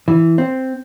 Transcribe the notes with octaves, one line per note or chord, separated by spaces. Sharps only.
E3
C4